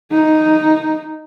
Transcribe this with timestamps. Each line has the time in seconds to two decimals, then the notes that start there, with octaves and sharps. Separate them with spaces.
0.11 D#4